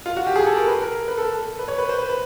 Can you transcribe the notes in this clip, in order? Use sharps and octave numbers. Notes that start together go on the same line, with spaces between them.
F4
F#4
G4
G#4
A4
A#4
B4
A#4
B4
A4
B4
C#5
B4
C5
B4
B4